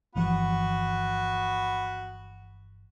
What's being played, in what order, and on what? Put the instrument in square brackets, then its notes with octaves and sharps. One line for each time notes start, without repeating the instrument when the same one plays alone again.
[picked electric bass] G1 E3 F3 [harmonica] B3 F#4